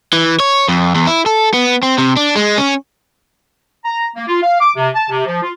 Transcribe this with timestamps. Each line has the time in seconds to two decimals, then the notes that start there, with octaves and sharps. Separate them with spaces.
0.13 E3
0.40 C#5
0.68 F2
0.95 E2
1.07 E4
1.26 A4
1.54 B3
1.83 C4
1.98 C3
2.17 D4
2.36 G#3
2.58 C#4
3.84 A#5
4.14 A#3
4.27 F4
4.41 F5
4.60 D6
4.75 C3
4.94 A5
5.09 C3
5.26 F3
5.41 F4